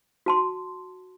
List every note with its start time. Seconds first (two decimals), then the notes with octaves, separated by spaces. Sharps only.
0.26 F#4 A5 C6